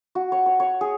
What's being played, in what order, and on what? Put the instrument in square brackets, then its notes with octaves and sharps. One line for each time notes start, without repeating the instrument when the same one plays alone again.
[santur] F#4
C#5
C#5
C#5
G#4